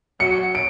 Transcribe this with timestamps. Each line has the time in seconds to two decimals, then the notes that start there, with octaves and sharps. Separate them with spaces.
0.20 F#3 C#7
0.55 D7